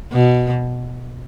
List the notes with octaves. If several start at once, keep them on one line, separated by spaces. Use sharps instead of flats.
B2